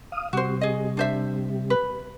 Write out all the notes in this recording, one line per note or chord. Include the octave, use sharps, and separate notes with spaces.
F5 D#6
C3 G3 F#4 C5
G#4 D#5
D4 C5 E5
B4